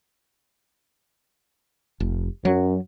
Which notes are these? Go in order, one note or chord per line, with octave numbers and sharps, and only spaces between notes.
F1
F#2 F#3